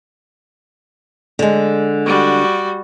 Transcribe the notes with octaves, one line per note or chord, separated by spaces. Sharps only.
D3 G#3
G3 F#4